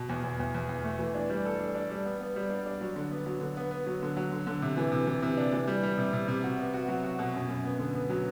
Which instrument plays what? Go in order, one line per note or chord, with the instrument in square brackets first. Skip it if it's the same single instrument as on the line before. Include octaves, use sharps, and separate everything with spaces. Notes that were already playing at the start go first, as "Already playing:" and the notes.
Already playing: [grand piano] B2
E2
E2
E2
E2
E2
A3
E3
D4
G3
A4
D4
D4
G3
B3
B3
G3
D4
D4
F#3
D3
B3
F#3
D3
B3
B3
F#3
D3
F#3
D3
D3
C3
E3
C3
E3
C3
D4
E3
G3
G3
C3
C3
C3
F#4
B3
F#4
F#3
F#4
B2
F#2
F#2
B3
D3
B3
F#3